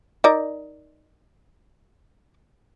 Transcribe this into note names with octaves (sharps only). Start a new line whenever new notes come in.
D#4 A#4 D5